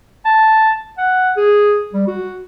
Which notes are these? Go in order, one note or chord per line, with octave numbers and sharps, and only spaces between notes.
A5
F#5
G#4
G3
F#4